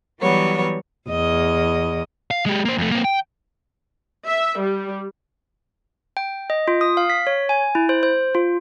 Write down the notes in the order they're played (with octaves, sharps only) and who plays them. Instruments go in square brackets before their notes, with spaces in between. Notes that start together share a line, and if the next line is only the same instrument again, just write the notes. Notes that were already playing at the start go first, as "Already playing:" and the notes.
[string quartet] E3 F#3 G3 B3 C#5
[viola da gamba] E2 D#5
[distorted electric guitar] F5
G#3 G4
A#3 C5
F2 A3
A#3 C4
G5
[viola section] E5
G3
[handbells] G5
D#5
F4
D#6
F5
B6
C#5
G#5
E4
C5
C5
F4